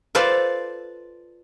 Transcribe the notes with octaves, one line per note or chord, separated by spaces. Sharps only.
F4 A4 B4 C5 D5 F5